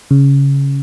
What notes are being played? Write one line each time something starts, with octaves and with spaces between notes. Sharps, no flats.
C#3